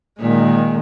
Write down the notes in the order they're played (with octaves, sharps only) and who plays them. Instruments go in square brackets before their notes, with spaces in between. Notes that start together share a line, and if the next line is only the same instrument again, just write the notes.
[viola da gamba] A#2 [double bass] D#3 G#3